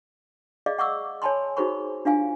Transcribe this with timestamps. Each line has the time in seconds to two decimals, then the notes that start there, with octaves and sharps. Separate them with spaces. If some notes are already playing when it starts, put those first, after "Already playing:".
0.66 G#4 D5 D#5 F5
0.78 F#5 C#6 D6 E6
1.22 C#5 G#5 A5 B5 C6
1.57 D#4 F#4 G#4 C5 B5 C#6
2.05 D4 F4 F5 G#5